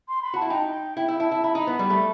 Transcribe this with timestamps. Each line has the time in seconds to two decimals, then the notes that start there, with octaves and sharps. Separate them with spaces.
0.08 C6
0.22 B5
0.34 F#4 A5
0.42 E4
0.50 D#4 G5
0.97 E4 G5
1.08 E4
1.20 E4 A5
1.31 E4
1.44 E4 B5
1.55 D#4
1.67 B3
1.79 G3
1.90 A3